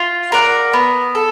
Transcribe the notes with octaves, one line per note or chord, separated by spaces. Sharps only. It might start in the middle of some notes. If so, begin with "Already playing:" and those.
Already playing: F4
A#4 D5 F#5
B3
A4